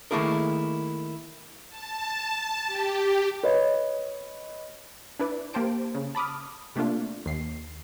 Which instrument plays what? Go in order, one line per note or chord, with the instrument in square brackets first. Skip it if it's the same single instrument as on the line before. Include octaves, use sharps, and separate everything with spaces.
[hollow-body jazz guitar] D#3 A3 A#3 E4 G#4 A#4
[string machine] A5
G4
[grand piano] B4 C#5 D#5
[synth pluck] D4 E4 B4 D5
A#3 G4 C5 A5 D7
C#3
A5 B5 D6 D#6 F6
C3 A3 A#3 D4 F4
D#2 C7